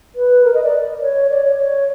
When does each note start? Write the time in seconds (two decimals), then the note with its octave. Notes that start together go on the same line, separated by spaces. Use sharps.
0.15 B4
0.44 A#4
0.54 D#5
0.63 D5
1.01 C#5
1.29 D5
1.44 C#5
1.59 C#5